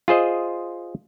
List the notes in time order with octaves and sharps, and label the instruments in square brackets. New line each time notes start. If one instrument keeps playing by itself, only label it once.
[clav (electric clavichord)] F4 G#4 C5 D#5